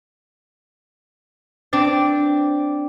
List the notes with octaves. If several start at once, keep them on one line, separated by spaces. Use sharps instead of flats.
C4 D4 D5